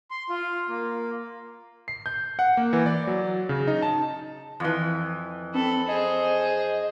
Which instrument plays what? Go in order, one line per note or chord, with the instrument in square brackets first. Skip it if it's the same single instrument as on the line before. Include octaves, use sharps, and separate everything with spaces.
[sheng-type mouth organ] C6
F4
A#3
[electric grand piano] C7
G6
F#5
A#3
E3
D5
F#3
C#3
D#4
A5
[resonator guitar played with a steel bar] F2 E3
[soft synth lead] C4 [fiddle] A4 B5
[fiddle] G#4 C5 [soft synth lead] D#5